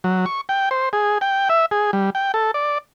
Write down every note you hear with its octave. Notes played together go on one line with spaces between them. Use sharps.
F#3
C#6
G5
C5
G#4
G5
E5
G#4
G3
G5
A4
D5